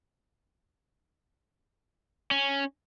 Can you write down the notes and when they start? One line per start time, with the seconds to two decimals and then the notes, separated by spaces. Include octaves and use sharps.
2.31 C#4